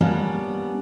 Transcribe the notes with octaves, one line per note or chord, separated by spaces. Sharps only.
G3 A#3 B3 C#4 D4